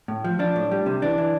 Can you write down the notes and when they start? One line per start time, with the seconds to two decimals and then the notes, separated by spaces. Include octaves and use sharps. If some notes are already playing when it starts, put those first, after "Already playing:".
0.08 A2
0.25 F3
0.39 F3 D4
0.56 A2
0.71 G3
0.86 C3
1.02 E3 D4
1.18 E3